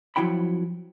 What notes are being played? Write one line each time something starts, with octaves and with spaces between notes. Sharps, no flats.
F2 F3 F#3 E4 G5 B5